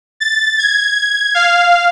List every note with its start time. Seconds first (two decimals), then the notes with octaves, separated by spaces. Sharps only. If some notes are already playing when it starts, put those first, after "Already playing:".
0.20 A6
0.58 G#6
1.35 F5